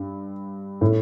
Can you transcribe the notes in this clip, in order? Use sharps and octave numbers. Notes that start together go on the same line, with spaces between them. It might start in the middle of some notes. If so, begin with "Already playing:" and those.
Already playing: G2
A2